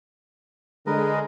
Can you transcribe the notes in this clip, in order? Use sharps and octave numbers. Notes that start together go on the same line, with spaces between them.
D3 G#3 A#4 B4 D#5